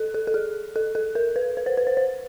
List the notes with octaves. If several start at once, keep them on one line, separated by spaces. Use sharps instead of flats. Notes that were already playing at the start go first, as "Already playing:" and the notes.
Already playing: A4
A4
A4
G#4
A4
A4
A#4
B4
B4
C5
B4
C5
C5